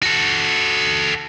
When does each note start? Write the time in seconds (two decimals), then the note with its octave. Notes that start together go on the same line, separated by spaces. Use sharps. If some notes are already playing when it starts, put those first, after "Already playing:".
0.03 F#4 A4